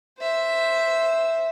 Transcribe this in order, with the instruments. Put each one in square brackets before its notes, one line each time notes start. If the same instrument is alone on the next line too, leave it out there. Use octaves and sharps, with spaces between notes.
[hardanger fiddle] C5 E5